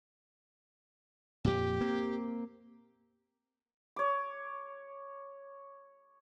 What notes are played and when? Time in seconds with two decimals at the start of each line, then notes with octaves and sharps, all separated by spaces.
1.45 F2 A#2 G4
1.81 A#3 C4
3.96 C#5 D6